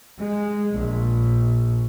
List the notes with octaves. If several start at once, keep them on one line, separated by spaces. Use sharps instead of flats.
G#3
A#1